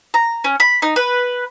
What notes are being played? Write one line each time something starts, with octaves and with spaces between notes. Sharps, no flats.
A#5
C#4
B5
D#4
B4